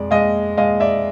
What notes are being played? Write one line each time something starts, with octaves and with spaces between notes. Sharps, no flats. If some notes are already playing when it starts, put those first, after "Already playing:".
Already playing: F2 G#3 D5
G#3 D#5 F5
G#3 D#5 F5
D5 E5